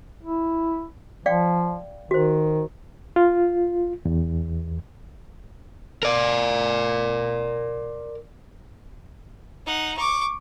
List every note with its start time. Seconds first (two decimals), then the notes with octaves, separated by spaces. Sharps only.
0.23 E4
1.26 F3 D5 F5 G5
2.11 D#3 F#4 C5
3.16 F4
4.05 E2
6.03 A#4 D5
9.66 D#4 F#5
9.97 C#6 D6